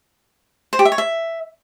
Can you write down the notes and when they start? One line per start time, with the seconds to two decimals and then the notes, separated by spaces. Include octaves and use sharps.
0.73 C5
0.79 G4
0.85 E5
0.92 C#5
0.98 E5